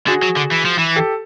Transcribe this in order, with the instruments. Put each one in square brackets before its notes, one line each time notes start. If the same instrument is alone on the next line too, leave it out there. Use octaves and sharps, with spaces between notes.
[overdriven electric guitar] D3 [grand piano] F#4 G#4
[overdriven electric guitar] F#3
D3
E3
F3
E3
[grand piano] G4 A4